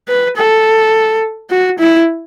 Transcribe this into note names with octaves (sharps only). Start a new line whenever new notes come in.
B4
A4
F#4
E4